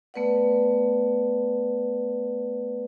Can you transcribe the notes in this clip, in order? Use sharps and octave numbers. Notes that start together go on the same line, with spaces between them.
A3 B3 B4 D5 F#5